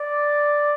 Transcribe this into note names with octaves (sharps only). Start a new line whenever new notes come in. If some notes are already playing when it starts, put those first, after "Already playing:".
Already playing: D5